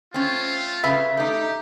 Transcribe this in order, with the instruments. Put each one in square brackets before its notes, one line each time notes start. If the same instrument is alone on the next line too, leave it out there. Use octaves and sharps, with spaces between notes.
[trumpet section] A3 F4 [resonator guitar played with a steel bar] C4 C#4
[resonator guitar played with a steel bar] C#3 B4 F5 [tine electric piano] E5
[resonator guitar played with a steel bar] A3 D#4 [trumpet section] G4